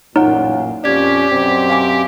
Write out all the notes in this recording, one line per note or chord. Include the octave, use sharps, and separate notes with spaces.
A1 F#2 A#2 D#4 C#5 F#5
F2 A#2 C#4 G4 D5 G#6
F#2 B2 C4
F5 G#5 D6